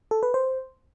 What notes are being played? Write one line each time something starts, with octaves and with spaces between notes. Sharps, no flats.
A4
B4
C5